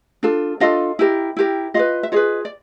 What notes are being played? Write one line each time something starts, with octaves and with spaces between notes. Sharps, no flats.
D4 F4 A4
D4 F4 A4 D#5 F5
E4 G4 A#4
E4 G4 A#4
F4 G#4 B4 D#5 F5
E5
F4 G#4 B4 C#5 D#5
D5